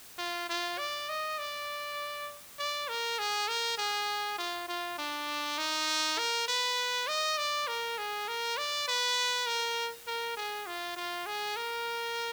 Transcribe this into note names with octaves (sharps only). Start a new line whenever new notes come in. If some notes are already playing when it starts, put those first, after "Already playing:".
F4
F4
D5
D#5
D5
D5
A#4
G#4
A#4
G#4
F4
F4
D4
D#4
A#4
B4
D#5
D5
A#4
G#4
A#4
D5
B4
A#4
A#4
G#4
F4
F4
G#4
A#4